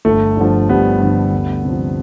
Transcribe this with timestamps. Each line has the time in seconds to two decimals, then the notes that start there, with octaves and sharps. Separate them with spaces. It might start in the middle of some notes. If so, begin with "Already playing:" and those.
0.05 G1 A3
0.37 G2 D3 F3
0.69 G1 G3 B3
1.00 G2 D3 F3
1.33 D2
1.64 C3 F3